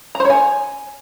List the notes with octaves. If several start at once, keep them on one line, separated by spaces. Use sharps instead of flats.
A#5
C5
C#5
G#5